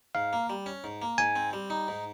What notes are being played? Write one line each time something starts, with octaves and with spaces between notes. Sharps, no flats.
G#2 F5
A#3
G3
C#4
G#2
A#3
G#2 G#5
C4
G3
D#4
G#2